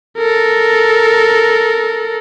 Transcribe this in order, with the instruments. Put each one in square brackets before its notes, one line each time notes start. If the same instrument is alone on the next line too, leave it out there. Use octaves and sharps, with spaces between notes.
[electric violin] A4 A#4